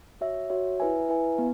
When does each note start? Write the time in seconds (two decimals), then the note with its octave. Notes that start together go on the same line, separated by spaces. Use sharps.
0.21 F#4 C#5 E5
0.50 F#4 C#5 E5
0.80 E4 B4 E5 G#5
1.09 E4 B4 E5 G#5
1.38 B3